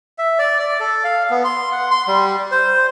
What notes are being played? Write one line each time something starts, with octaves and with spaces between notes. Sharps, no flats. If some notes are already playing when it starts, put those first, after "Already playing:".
E5
D5
D5
A4
F5
B3
C6
F#5
C6
G3
C5